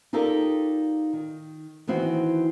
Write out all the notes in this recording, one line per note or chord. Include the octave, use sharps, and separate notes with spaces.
D#4 F4 G4 A4 A#4 D5
D#3
D#3 E3 C4 E4 F#4